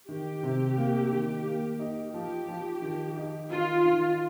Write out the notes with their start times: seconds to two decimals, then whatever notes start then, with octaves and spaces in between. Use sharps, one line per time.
0.09 D#3 G4
0.43 C3
0.77 A#3
1.11 D#3
1.46 A#3
1.79 D#4
2.14 F3 G4
2.48 F3
2.82 D#3
3.17 D#4
3.51 D#3 F4
3.85 D#3